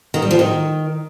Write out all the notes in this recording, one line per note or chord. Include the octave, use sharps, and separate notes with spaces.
D#3
G3
F3
D#3